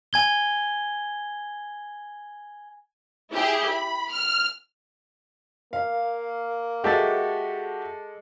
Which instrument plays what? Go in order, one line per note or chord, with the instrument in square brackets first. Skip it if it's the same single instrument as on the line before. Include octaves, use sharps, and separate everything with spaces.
[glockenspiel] G#5 G#6 G7
[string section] E4 G4 G#4
B5
F6
[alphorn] A#3 [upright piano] F5
[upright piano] G#3 A4 A6 [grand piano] F#4 G4 E5